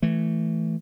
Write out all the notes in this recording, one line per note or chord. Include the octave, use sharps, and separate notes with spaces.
E3 A3